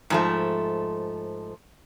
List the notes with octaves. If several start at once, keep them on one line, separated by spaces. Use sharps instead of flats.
G#2 F3 A3